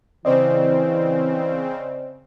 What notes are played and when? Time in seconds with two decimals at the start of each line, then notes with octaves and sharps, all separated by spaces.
0.25 C#3 E3 C4 C5 D5 D#5